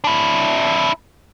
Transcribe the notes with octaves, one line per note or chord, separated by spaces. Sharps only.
D4 E4